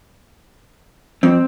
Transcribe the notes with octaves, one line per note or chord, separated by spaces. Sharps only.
F2 C4